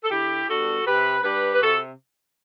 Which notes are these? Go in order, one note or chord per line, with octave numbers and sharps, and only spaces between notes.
A4
D3 E4 G4
G3 B3 D4 F#4 A4
C3 G4 B4
G3 D4 G4 B4
B4
C3 F#4 A4